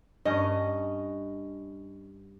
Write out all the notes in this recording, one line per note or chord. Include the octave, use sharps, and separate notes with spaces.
G2 C#4 D#5